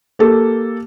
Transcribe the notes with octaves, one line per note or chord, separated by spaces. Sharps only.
A#3 G4 A4